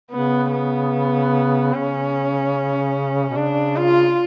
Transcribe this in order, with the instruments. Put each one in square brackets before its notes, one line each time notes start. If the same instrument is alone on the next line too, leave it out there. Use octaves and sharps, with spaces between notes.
[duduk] C#3 [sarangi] B3
[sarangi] B3
[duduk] C#3 [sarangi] C#4
[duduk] B2
[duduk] C#3 [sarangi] D4
[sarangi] F4